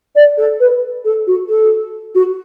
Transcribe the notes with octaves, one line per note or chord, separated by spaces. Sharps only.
D5
A4
B4
A4
F#4
A4
F#4